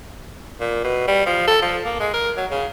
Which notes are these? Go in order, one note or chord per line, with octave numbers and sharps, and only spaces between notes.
A#2
B2
G3
F3
A4
F3
A#3
G#3
A#4
F#3
C#3